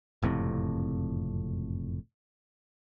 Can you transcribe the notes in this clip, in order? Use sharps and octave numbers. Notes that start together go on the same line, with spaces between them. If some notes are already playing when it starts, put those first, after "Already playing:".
F#1 F2 A2 C3